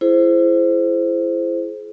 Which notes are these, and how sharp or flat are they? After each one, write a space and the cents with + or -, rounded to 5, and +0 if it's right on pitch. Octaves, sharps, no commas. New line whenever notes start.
E4 +35 G#4 +35 C5 +0